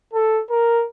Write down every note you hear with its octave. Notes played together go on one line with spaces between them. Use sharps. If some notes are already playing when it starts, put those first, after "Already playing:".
A4
A#4